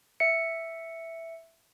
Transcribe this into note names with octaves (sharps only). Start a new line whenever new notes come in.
E5 C#7